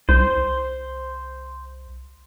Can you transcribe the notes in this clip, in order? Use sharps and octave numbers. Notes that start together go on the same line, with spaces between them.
C2 C5